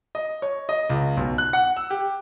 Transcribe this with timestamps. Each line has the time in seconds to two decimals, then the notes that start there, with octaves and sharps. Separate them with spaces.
0.15 D#5
0.42 C#5
0.69 D#5
0.89 C#2
1.17 B1
1.38 F#6
1.53 F#5
1.77 E6
1.90 G4